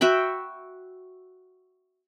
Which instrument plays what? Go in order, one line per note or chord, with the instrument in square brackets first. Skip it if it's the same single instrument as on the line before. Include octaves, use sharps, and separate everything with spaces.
[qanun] F#4 E5 G5 B5